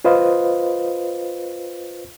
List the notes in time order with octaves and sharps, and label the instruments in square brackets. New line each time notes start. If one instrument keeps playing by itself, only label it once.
[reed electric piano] F4 B4 C5 D#5 F5